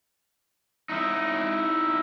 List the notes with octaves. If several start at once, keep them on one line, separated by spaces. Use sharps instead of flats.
D#4 E4